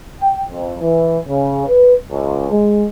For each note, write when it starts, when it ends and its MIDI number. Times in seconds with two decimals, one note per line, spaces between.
0.21 0.41 79
0.49 0.75 41
0.80 1.17 52
1.28 1.65 49
1.66 1.94 71
2.11 2.50 37
2.51 2.85 56